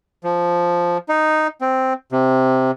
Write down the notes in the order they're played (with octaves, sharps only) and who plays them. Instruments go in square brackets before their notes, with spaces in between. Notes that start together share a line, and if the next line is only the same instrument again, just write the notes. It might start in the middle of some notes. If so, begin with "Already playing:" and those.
[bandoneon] F3
D#4
C4
C3